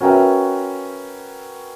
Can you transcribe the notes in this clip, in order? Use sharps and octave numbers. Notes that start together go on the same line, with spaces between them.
C#4 F#4 A#4 B4 E5 G5